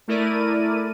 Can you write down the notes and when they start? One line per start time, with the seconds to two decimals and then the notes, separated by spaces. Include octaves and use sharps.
0.08 A3 E4 A#4 D5 D#7